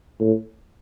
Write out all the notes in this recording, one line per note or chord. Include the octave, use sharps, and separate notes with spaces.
A2